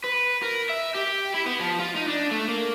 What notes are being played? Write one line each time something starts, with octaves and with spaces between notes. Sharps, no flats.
B4
A#4
E5
G4
E4
B3
F3
F4
D#4
D4
A3
A#3